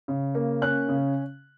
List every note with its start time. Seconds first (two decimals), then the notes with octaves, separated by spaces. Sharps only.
0.08 C#3
0.35 A#3
0.62 C#4 F#6
0.89 C#3